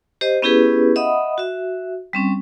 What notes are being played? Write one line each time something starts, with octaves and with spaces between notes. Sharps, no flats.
G4 C5 D#5
B3 C#4 E4 G4 G#4 B4
D#5 E5 F#5 B5 D#6
F#4 E5
G3 C4 C#4